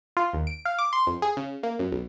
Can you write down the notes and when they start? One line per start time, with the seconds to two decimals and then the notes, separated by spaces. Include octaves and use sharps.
0.17 F4
0.33 D#2
0.47 D7
0.65 F5
0.79 D6
0.93 C6
1.07 F2
1.22 G#4
1.37 C#3
1.63 A#3
1.79 F#2
1.92 B1